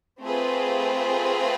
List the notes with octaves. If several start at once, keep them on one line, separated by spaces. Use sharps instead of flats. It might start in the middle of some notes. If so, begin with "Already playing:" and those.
A3 C4 F4 G#4 B4